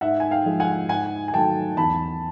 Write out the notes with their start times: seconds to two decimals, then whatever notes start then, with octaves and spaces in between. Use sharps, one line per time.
0.01 G#2 E5 F#5
0.20 G#5
0.31 F5 G5
0.45 F3 G#3
0.60 F#5 G#5
0.89 G#2 F#5 G#5
1.28 G#5
1.34 D#3 F#3 A3 G5 A5
1.77 E2 A5 B5